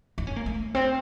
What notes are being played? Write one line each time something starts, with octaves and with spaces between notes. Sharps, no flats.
D#4
C#4
A#3
A3
C4